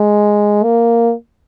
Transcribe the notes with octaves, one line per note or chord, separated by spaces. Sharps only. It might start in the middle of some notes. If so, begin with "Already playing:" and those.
Already playing: G#3
A#3